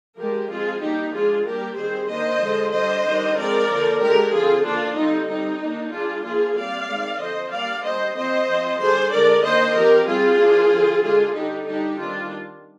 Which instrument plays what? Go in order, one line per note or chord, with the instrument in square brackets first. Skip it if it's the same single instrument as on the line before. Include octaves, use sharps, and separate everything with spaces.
[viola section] F3 G#3 D4 G4 A#4
F3 G#3 C4 F4 G#4
G3 A#3 D4 D#4 G4
F3 G#3 D4 F4 G#4
G3 A#3 D4 G4 A#4
D#3 G3 C4 G#4 C5
D#3 A#3 D4 C5 D#5
D3 F3 G#3
G3 D4 C5 D#5
D#3 G3 D4
F3 G#3 C4 A#4 D5
D3 F3 A#3
D3 G#3 D4 G4 A#4
D3 F3 C4 F4 G#4
D3 F3 A#3 D4 F4
D3 G3 C4 D#4
G3 C4 D#4
D#3 A#3 D4
G3 D4 F4 G#4
F3 A#3 D4 F4 G#4
G3 C4 D5 F5
D#3 G#3 C4
D3 F3 C4 C5 D#5
G3 A#3 D4 D5 F5
G3 D4 C5 D#5
F3 C4 C5 D#5
F3 C4
D3 G3 D4 G#4 C5
D3 G#3 D4 A#4 D5
D#3 A#3 D4 C5 D#5
F3 C4 G4 A#4
G3 C4 F4 G#4
F3 A#3 D4
D3 F3 C4
D3 G#3 D4 F4 G#4
D3 G3 D4 D#4 G4
G3 D4 D#4 G4
D#3 G3 C4 D4 F4